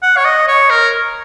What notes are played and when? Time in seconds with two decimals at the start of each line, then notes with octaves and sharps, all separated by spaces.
0.03 F#5
0.17 C#5
0.25 D#5
0.48 C#5
0.70 A#4